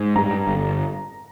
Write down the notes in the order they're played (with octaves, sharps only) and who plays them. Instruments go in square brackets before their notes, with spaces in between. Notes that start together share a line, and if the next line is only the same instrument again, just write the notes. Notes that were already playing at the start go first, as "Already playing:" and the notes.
Already playing: [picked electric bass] G#2
[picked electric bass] G2 [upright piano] A#5
[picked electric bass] G1